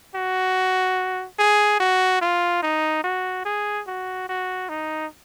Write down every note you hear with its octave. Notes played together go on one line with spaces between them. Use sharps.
F#4
G#4
F#4
F4
D#4
F#4
G#4
F#4
F#4
D#4